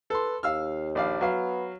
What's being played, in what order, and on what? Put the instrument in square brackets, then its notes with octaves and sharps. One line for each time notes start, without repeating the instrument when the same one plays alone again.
[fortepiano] A4 C6 [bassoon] B4
[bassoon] D#2 [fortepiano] F5 E6 F6
[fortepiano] A#1 D5 F5
[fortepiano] F#3 F5 [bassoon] B3